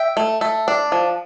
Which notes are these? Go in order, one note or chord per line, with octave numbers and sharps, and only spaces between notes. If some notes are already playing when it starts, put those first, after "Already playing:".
Already playing: E5 G5
A3
A3
D4
F3